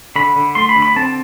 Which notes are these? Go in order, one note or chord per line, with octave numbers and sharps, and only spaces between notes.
D3 B5
D3
A3 C6
B5
D3
B5
C4 A5